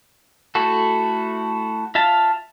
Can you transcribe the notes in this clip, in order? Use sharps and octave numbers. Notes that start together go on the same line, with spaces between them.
A3 E4 F#4 A4
F4 E5 F5 A5